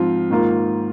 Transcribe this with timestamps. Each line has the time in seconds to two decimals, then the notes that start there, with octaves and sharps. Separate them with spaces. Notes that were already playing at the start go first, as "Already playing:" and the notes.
Already playing: G#2 F3 C4 F4
0.30 G#2 D#3 A#3 F4